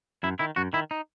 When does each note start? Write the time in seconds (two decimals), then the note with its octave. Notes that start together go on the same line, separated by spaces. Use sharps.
0.23 F#2 E4
0.39 D#3 E4
0.56 F#2 F#4
0.73 D#3 E4
0.91 D#4